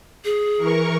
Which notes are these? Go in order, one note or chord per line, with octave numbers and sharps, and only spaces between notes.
G#4
E3 A#4 C#6